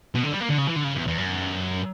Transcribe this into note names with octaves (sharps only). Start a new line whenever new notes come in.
B2
D3
G3
A#3
D3
C#3
E3
D3
C#3
E2
E2
F#2